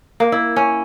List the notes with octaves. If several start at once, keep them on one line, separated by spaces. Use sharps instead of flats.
A#3
E4
C#4